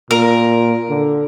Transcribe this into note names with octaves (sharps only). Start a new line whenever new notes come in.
A#2 A#4
D3